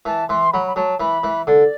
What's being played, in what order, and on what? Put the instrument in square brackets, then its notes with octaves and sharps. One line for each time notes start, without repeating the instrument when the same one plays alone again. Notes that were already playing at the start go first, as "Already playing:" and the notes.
[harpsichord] E3 [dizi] A5
[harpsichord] E3 [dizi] C6
[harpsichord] F#3 [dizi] B5
[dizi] B5
[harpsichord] F#3 [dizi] A5
[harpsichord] E3 [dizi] B5
[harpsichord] E3
[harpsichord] D3 [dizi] D5